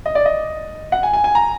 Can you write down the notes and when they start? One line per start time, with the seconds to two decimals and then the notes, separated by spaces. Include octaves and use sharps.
0.06 D#5
0.15 D5
0.26 D#5
0.92 F#5
1.03 G#5
1.13 G#5
1.24 G#5
1.35 A#5